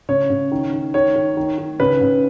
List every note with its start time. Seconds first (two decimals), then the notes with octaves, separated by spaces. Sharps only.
0.09 C#3 C#5
0.30 C#3
0.51 D#3
0.73 D#3
0.94 D#3 C#5
1.16 D#3
1.37 D#3
1.58 D#3
1.80 C#3 B4
2.01 C#3